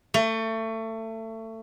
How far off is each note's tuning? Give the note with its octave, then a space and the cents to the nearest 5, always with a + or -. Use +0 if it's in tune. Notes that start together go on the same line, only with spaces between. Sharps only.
A3 +25